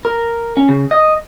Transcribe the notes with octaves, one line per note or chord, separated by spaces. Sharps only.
A#4
C#4
C#3
D#5